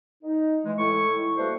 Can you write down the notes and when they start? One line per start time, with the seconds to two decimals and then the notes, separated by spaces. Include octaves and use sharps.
0.23 D#4
0.65 E3 G#3
0.78 A2 E4 C#6
1.37 G3 A3 A#3 F#4 B4 C5